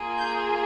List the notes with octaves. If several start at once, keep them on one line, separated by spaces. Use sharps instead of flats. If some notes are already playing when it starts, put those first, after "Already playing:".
Already playing: A#3 F4 G#4
G6